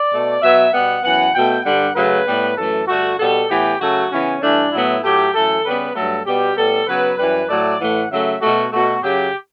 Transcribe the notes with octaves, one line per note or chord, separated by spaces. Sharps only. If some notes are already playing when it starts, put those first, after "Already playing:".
Already playing: D5
B2 A3
B2 F#3 B3 E5
B2 G3 B3 F#5
F#2 E3 B3 F#5
B2 A3 G5
G2 D3 G3 F#5
F#2 C#3 F#3 A3 B4
A2 G3 B3
F#2 E3 A3 A4
G2 D3 A3 F#4
B2 G3 B3 A4
A2 E3 B3 G4
C#3 F#3 A3 F#4
C#3 E3 B3 C#4
G2 E3 A3 D4
A2 F#3 B3 E4
A2 F#3 A3 G4
F#2 E3 A3 A4
C#3 G3 B3 B4
G2 F#3 A3 A4
B2 G3 B3 G4
A2 G3 B3 A4
C#3 F#3 B3 B4
F#2 E3 G3 B4
A2 F#3 A3 D5
A2 E3 A3 F#5
C#3 F#3 A3 E5
B2 A3 F#4
B2 A3 F#4
F#2 C#3 F#3 G4